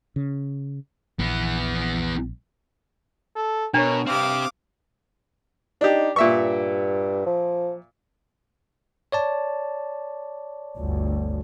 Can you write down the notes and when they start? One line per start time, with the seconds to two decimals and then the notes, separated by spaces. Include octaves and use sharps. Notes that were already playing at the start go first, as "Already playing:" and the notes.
0.16 C#3
1.20 A#1 E3 B3
3.36 A4
3.74 B2 D4 A#4 C#5
4.07 G2 C4 G4 F5 D6 D#6
5.81 D4 D#4 G4
6.16 G2 A#2 E5 C#6
7.26 F3
9.12 C#5 D5 A5
10.77 G1 D2